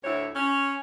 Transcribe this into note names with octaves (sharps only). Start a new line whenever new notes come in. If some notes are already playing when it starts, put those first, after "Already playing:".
D2 A2 E4 C#5
C#4